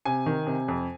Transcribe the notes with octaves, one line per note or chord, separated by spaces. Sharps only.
C3 G#5
D#3
C3
F2